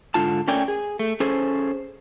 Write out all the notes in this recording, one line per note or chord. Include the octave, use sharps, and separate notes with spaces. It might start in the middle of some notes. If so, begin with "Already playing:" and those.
G#2 D3 F4 A5
A3 C#4 A#4 D5 G5 G#5
G#4
A3
C#4 G#4 A4 C5